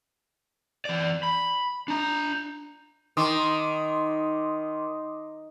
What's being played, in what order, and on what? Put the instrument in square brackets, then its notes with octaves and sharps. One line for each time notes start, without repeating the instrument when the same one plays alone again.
[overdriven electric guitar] E3 D5
B5
D4 A#5
[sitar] D#3 [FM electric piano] C6 D6 D#6